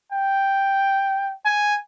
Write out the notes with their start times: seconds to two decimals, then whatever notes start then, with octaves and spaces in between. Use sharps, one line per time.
0.12 G5
1.45 G#5